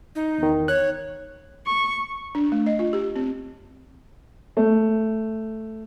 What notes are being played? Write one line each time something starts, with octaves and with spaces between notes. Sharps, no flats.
D#4
E2 D#3
C#5 F#6
C#6
D4
A3
D#5
F4
G4
C4
A3